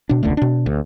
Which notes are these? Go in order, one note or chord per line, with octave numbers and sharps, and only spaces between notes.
B2 D4
E1 C#2 D3 A3
B2 D4
D2